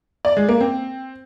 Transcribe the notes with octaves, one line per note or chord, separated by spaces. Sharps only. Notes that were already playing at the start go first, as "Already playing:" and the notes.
D5
G#3
A#3
C4